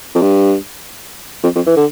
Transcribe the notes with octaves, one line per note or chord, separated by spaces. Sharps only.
F2
G2
F2
F2
E3
D3